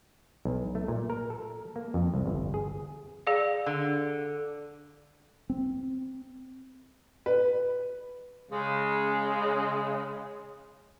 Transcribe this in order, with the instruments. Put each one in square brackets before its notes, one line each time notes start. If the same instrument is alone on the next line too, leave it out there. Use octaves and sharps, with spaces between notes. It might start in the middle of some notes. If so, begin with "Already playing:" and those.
[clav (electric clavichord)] B1
A3
A#2
A#4
A4
A#3
F2
C2
G1
G#4
[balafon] G#4 D5 F5
[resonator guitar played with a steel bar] D3
[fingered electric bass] C4
[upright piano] B4
[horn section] C#3 G#3